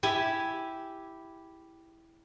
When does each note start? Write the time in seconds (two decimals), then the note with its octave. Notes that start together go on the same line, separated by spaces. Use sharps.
0.03 E4 G4 E5 G#5